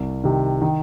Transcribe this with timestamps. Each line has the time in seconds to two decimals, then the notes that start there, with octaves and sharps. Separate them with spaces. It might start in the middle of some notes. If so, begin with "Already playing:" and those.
Already playing: C2
0.24 C3 D#3
0.62 D#3